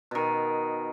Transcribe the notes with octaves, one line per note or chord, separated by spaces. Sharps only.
B2 D#3